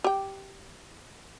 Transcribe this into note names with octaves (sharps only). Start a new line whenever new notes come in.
G4 G5